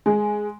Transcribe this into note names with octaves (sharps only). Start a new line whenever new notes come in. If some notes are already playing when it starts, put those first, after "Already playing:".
G#3